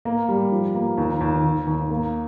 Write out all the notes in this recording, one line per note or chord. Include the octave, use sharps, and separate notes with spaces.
A#3
G3
F3
A#3
D#2
D#2
D#2
D#2
A#3